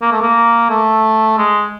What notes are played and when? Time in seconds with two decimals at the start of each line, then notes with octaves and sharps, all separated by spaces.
0.02 A#3
0.12 A3
0.21 A#3
0.69 A3
1.38 G#3